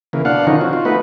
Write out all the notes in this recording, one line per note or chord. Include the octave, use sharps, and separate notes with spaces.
C#3 E3 A#3
B2 D4 F5 F#5
D3 D#3 F3 C#4 D#4
C4 F#4
F4 F#4
A3 B3 D#4 B4